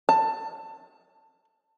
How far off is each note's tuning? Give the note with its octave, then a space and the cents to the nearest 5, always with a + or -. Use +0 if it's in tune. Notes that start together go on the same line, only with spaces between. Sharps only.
A5 +15